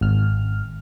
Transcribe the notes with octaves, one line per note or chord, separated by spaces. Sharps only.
G#1 F6